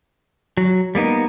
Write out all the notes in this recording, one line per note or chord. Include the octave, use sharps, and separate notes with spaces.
F#3
G3 A#3 B3 D#4